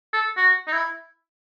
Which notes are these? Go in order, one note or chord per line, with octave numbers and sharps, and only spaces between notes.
A4
F#4
D#4
E4